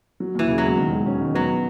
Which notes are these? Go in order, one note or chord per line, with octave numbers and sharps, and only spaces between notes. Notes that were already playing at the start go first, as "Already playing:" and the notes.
F#3
D#2 E3
C#3
F#3
E1
D#3
G#3
C#4
D#3
F#3 B3